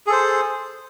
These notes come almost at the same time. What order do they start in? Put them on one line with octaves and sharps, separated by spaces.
G#4 A4 C5